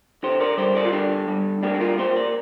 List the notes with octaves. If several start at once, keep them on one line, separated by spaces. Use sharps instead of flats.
D3 G4 C5
A#4 D5
G3 G4 C5
A#4 D5
F4
D3 D4 G4
G3
A#3 D4 G4
G4
F4 A#4
A#3 G4 C5
A#4 D5